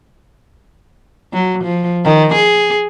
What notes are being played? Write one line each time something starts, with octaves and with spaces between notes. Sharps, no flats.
F#3
F3
D#3
G#4